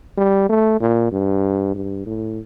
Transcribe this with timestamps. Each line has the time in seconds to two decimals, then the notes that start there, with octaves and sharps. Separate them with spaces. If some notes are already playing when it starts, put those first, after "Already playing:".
0.17 G3
0.49 A3
0.81 A#2
1.12 G2
1.75 G2
2.06 A2